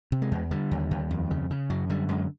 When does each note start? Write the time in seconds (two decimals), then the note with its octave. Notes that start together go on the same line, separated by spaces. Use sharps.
0.12 C3
0.22 G#3
0.32 E2
0.51 D3 G3
0.71 D#2
0.91 D#2
1.11 F2
1.31 C#3
1.51 C#3
1.70 F#2 F#3
1.90 D3 G3
2.09 F#2 G#3